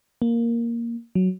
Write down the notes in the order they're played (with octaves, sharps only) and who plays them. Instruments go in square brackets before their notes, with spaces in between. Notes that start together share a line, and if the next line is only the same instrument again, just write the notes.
[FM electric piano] A#3
F#3